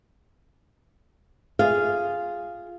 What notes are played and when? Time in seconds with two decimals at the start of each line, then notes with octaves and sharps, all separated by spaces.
1.59 F4 G#4 F5